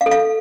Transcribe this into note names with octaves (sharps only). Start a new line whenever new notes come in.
F5
A4
F5